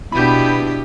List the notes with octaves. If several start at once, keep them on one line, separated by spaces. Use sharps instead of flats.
B2 B3 D4 E4 G4 B5 G6